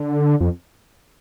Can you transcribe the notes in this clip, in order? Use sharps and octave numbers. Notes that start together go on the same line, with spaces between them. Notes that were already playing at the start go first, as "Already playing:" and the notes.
Already playing: D3
F2